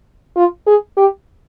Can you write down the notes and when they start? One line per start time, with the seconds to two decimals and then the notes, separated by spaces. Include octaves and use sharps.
0.36 F4
0.66 G#4
0.97 G4